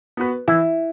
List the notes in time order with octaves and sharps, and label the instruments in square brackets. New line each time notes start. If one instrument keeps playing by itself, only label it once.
[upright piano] B3 F#4 B4
[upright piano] E3 [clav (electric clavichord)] E4